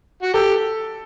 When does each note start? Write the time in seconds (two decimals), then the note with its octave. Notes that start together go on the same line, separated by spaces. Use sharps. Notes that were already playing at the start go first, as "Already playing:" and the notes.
0.23 F#4
0.34 G4 A4